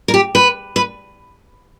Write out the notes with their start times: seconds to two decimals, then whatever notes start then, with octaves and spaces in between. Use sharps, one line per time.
0.08 A#4
0.14 G4
0.35 B4
0.76 B4